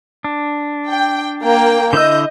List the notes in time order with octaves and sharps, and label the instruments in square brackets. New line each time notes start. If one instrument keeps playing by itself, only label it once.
[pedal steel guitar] D4
[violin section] G5
A#3 G5
[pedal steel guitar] D3 E4 E6 [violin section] D#5 G6